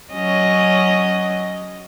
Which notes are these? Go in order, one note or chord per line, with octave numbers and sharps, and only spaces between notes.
F#3 C#4 D#5